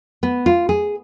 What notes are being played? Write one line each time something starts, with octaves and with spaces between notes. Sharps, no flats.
B3
F4
G#4